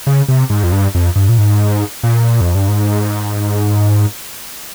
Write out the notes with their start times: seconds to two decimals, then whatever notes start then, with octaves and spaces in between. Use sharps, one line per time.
0.07 C#3
0.29 C3
0.50 G#2
0.64 F2
0.72 G2
0.95 F2
1.16 G2
1.29 A#2
1.38 G#2
2.03 A#2
2.41 F2
2.55 G2
2.68 G#2